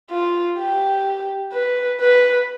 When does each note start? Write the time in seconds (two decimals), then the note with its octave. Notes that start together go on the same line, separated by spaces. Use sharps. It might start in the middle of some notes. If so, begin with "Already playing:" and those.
0.10 F4
0.58 G4
1.53 B4
2.00 B4